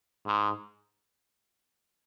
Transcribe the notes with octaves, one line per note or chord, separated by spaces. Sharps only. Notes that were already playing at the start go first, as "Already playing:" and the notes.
G#2